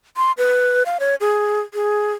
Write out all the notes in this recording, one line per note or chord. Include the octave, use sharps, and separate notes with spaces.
C6
B4
F5
C#5
G#4
G#4